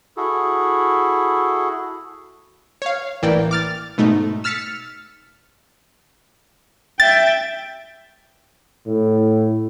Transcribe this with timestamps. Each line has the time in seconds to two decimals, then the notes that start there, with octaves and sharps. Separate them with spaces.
0.17 E4 F#4 G#4 A4
2.82 C#5 F5
3.22 A1 E3 A#3 D5 G5
3.51 D6 F6 A6
3.98 G#2 B2 A3 D#4
4.44 E6 F6 A6 B6 C#7
7.00 E5 G5 A6
8.87 A2